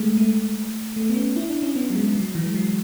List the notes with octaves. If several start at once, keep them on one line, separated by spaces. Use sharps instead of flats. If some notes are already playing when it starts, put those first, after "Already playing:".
Already playing: G#3 A3
A3
A3
B3
C#4
E4
D4
C#4
B3
F#3
G#3
F#3
E3
G#3
F#3